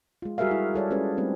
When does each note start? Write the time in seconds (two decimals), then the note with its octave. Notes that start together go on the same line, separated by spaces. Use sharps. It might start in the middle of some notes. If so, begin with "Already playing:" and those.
0.22 G#3 F4
0.38 G3 F#4 G#4 A#4 E5 F5
0.51 E4
0.74 G3 A4 C#5 D5
0.91 G#3 C#4 F4 G#4 B4
1.17 G3 A3 C4 D#4 B4